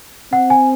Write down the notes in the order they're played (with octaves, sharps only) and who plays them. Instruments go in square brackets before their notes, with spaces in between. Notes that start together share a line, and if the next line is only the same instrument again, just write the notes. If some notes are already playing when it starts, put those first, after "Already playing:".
[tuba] C4 [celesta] F#5
[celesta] G#5